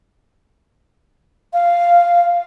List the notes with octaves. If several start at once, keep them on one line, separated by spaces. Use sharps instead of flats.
F5